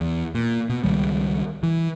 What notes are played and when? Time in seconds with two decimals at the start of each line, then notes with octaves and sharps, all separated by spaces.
0.01 E2
0.35 A#2
0.69 B2
0.84 C#2 D#3 G3
1.63 E3